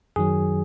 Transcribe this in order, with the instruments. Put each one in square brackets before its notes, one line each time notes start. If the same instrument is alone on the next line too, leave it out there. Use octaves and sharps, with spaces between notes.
[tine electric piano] F#2 D#3 F#3 G#4